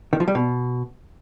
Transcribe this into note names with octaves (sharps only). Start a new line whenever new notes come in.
D#3
F3
G3
B2